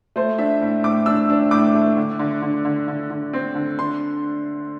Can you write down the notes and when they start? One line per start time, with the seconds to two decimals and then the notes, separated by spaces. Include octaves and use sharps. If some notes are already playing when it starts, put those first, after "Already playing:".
0.16 A3 C5
0.39 D4 E5
0.61 A2
0.84 A2 D6
1.06 D4 E6
1.30 D4
1.51 A2 D6
1.75 A3
1.97 D3
2.19 D3
2.42 D3
2.65 D3
2.88 D3
3.11 D3
3.33 C4
3.55 D3
3.79 D4 C6